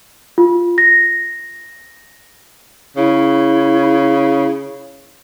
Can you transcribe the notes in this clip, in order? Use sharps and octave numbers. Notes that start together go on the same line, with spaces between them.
F4
A#6
C#3 E4